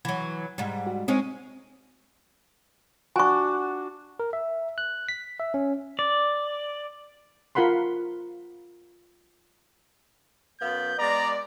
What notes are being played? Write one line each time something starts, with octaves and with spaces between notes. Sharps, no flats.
E3 F#3 G#6
G#2 G3
F#4
G#3 C4 C#4 D#4
D4 F#4 G#5 C#6
A#4
E5
F#6
B6
E5
C#4
D5
F4 A#4 F#5 B5 C6
F#2 B3 F5 G6
G#3 B3 D5 A#5